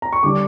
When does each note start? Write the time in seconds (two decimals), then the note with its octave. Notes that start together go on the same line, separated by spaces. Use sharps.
0.02 A#5
0.12 C#6
0.23 D3 G3 D4 D6